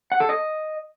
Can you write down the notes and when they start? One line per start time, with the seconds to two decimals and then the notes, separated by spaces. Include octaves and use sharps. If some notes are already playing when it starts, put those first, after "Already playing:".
0.12 F#5
0.20 A4
0.29 D#5